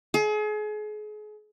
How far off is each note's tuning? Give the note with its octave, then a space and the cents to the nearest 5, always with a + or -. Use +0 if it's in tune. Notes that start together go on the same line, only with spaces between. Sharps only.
G#4 +35